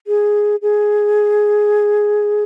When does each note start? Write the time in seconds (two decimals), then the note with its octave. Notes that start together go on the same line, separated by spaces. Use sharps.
0.07 G#4
0.62 G#4